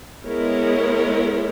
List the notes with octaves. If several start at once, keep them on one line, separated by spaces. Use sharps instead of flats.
G#3 B3 E4 A#4 C#5